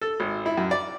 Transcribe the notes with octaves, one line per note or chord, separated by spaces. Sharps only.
A4
G#1
E4
F#2
D5